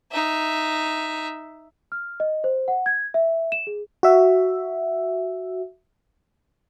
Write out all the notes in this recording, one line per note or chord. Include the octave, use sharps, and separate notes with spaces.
D#4 E5
F6
D#5
C5
F#5
G#6
E5
E7
G#4
F#4 E5